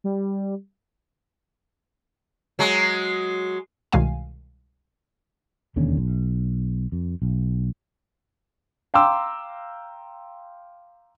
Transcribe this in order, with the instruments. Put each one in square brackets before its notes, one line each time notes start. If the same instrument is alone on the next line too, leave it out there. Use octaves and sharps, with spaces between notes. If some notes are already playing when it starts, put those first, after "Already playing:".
[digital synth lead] G3
[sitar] F#3 G#3
[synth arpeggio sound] C2 B2 D#3 G#3 F5 G#5
[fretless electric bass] E1 D#2 D3 C#4
B1
F2
B1
[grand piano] F5 G5 A#5 C6 D6 E6